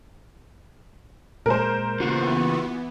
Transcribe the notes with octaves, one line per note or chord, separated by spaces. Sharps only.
A#2 G#3 A#4 C5
C#3 E3 A#3 B3 F4 F#4